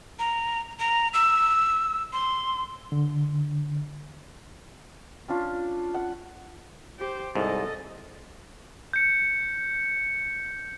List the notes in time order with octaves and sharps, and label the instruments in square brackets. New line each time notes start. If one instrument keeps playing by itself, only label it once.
[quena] A#5
A#5
E6
C6
[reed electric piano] D3
[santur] C#4 D4 F4
F#5
[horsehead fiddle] G4 C5
[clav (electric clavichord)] C2 G#2 [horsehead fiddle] A4 D#5
[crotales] G6 C#7